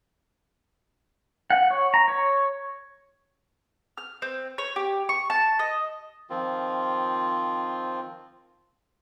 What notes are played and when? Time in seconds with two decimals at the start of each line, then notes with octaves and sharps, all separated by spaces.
1.50 F#5
1.71 C#5
1.94 A#5
2.08 C#5
3.98 F6
4.22 C4
4.58 C#5
4.76 G4
5.09 C#6
5.30 A5
5.59 D#5
6.30 D#3 F3 C4 F4